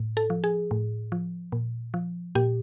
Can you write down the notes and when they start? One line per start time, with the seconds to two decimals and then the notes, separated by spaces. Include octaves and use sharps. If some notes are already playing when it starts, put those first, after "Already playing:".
Already playing: A2
0.17 A4
0.30 F3
0.44 G#4
0.71 A2
1.12 F3
1.52 A#2
1.94 F3
2.35 A#2 G4